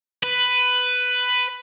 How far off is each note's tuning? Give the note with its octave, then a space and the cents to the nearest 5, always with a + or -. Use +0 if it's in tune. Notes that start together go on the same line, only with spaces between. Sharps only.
B4 +10